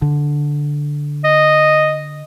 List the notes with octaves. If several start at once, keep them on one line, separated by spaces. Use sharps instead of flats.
D3
D#5